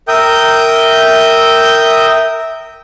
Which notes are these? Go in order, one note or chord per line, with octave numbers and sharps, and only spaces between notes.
A#4 E5 G5 D#6 G6